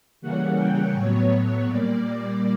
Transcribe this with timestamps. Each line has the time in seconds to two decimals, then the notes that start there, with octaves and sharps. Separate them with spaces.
0.21 C#3 E3 G3 A#3 C#4 F#5
0.57 G5
0.93 A2 F#3 B3 C#5
1.29 C#5
1.65 A#2 G3 A#3 D5